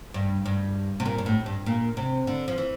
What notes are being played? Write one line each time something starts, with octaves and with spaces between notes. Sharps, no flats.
G2
G2
C3
A#2
G2
A2
G2
A#2
C3
D3
F3
E3